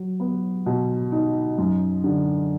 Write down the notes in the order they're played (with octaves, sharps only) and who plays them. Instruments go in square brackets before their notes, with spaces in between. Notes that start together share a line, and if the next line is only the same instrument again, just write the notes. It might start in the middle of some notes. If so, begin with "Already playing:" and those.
Already playing: [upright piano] F#3
B3
B2
D#4
F#2
D3